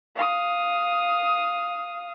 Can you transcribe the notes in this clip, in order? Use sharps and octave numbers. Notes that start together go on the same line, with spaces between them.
F5 D#6